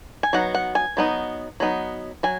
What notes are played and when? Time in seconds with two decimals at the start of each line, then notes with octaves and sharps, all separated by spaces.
0.23 G#5
0.33 F#3 B3 D#4 F#5
0.55 F#5
0.75 G#5
0.97 F#3 B3 D#4
1.60 F#3 B3 D#4
2.23 F#3 G#5